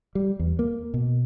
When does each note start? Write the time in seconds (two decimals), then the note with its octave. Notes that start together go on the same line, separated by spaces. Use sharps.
0.15 G3
0.39 E2
0.59 A#3
0.94 B2